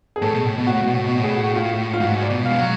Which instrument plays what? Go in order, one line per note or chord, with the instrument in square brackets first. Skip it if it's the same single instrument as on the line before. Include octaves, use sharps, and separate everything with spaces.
[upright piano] G#4
[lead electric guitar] A2 [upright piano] A4
[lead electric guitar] B2
A2
B2
[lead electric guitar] A2 [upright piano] F#4
[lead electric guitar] B2
[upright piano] F#4
[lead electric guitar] A2
[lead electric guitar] B2 [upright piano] F#4
[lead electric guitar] A2 [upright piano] G#4
[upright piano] F#4
F4
F4
[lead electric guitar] G#2 [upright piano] F#4
[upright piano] D5
[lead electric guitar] B2
[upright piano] F5
[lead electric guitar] G#3
F#3